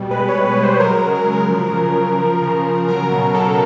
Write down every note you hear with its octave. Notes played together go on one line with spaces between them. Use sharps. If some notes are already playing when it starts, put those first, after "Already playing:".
Already playing: B2 G3
G#3 B4
C#5
B2
B4
G#3
C5
F#3 A#4
A#4
C#3
A#4
F#3
A#4
F3
C#3
C#3
F3
C#3
C#3
F#3 A#4
B2 A#4
F#3 A4